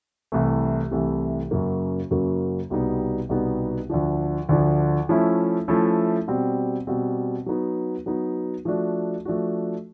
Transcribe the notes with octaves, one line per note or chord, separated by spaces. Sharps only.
C2 C3 E3 A3
C2 C3 E3 A3
F#2 C#3 F#3 A#3
F#2 C#3 F#3 A#3
C2 B2 G3 B3 D#4
C2 B2 G3 B3 D#4
D2 D3 F3
D2 D3 F3
F3 A3 C#4 E4
F3 A3 C#4 E4
B2 G3 C4
B2 G3 C4
F#3 B3 D#4
F#3 B3 D#4
F3 A3 D4 F#4
F3 A3 D4 F#4